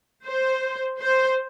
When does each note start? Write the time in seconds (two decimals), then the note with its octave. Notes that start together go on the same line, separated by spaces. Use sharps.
0.26 C5
1.00 C5